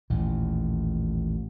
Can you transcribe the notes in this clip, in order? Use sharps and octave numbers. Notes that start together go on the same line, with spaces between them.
A1 D#2 A#2